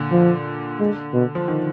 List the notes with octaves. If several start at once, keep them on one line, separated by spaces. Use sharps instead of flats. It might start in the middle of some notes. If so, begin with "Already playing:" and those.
Already playing: A#2 D3
F3
G#3
B2
F3
D#3